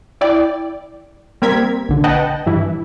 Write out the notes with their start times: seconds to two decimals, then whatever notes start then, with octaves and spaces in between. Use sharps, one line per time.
0.21 E4 D5 G5
1.42 G3 A#3 C4 A#4 G#6 B6
1.89 A#1 D3
2.04 B4 D#5 F#5 G5 A5
2.46 G2 E3 E4